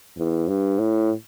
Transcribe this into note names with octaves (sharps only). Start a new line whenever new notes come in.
E2
G2
A2